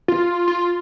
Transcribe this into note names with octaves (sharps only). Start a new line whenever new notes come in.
F4
F4